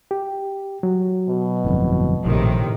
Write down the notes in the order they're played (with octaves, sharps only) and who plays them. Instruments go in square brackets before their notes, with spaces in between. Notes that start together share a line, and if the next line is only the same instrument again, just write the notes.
[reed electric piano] G4
F#3
[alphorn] B2
[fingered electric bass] G1 F2 A2
[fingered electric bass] A#1 [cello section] A2 C3 D#3